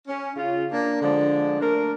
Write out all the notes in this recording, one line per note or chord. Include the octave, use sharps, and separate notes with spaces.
C#4
C#3 F4
A#3 D4
D3 F3 G#3 D4
A3 A#3 D4 A#4